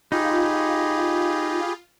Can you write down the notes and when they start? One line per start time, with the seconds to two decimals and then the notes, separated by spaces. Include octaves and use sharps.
0.12 D#4 F4 G4 G#4 B5